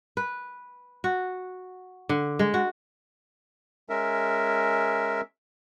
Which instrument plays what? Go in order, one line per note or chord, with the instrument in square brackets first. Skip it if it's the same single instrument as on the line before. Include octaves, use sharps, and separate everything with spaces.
[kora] B4
F#4
D3
G#3
F#4
[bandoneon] G#3 C#4 A#4 E5